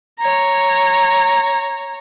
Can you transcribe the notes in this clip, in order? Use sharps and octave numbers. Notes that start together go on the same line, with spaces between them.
C#5 A#5